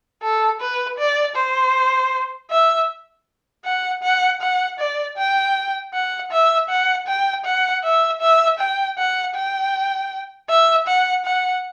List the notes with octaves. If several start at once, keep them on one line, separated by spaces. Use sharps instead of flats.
A4
B4
D5
C5
E5
F#5
F#5
F#5
D5
G5
F#5
E5
F#5
G5
F#5
E5
E5
G5
F#5
G5
E5
F#5
F#5